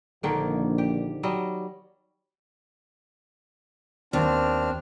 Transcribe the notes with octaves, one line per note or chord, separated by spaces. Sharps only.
A#1 D3 D#3 A#3
G4
F#3 G3 D#5
D#2 C4 D4 F6